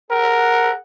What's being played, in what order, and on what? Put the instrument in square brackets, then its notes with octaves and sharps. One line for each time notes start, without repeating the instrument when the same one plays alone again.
[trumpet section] G#4 F#5 [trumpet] A#4